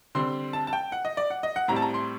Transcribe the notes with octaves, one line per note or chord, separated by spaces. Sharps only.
D3 G3 C4 C6
A5
A5
G5
F#5
D#5
D5
F#5
D#5
F#5
A2 G3 C4 A#5
A5
A#5
C6